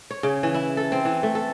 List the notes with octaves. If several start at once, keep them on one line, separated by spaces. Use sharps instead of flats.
C#5
C#3
E3
E4
A4
C4
E3
A3
A4